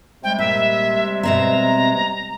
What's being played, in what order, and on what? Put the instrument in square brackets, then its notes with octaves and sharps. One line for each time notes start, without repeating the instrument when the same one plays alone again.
[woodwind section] C3 G3 G#3 [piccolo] G5
[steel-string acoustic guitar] A#2 [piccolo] E5
[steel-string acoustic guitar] B2 C4 E5 [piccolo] A#5